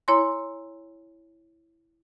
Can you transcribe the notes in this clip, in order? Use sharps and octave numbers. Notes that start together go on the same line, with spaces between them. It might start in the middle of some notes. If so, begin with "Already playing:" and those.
E4 C#5 G#5 A#5 C6